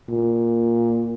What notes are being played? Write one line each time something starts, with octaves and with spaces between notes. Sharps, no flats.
A#2